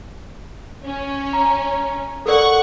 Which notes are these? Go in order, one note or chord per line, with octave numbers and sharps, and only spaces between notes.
C#4
A#5
A4 A#4 D5 F#5 C#6